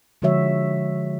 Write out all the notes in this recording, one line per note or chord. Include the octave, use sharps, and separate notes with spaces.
D3 F3 G#3 F#4 C#5 E5